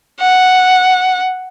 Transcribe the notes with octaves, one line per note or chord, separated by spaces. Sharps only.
F#5